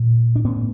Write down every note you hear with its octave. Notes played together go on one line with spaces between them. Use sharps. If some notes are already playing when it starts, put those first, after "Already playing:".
Already playing: A#2
D4
A2 B3 C#4